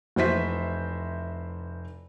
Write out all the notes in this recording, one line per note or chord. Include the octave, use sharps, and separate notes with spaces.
F1 E3 F#4 C5 E5 B6